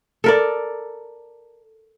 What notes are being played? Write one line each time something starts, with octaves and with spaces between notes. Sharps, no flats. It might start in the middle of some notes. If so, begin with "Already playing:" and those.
A4 A#4 D5